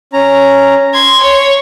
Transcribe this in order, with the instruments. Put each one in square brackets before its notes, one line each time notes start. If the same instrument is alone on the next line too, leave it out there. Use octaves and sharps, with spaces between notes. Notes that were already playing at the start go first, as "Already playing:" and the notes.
[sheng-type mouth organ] C#4 A#5
[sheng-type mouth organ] C6 [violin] G#6
[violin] C#5